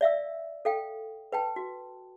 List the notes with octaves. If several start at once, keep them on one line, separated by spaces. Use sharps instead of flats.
D5 E5 F5 E6
A4 F5 G5
B4 G5 A5
F#4